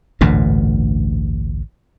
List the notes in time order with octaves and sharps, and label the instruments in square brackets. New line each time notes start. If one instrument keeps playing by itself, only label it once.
[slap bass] A1 D2 G2 A#2